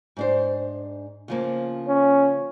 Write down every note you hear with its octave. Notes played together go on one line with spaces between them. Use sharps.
G#2 D4 C5
C#3 F3 A#3
C#4